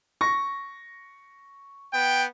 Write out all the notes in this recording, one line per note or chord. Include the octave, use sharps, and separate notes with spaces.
C#6 A#6
B3 G5